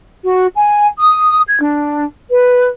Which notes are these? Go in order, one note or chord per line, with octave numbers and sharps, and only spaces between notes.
F#4
G#5
D#6
G#6
D4
B4